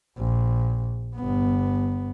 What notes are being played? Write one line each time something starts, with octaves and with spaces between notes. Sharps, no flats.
A#1
G1 B3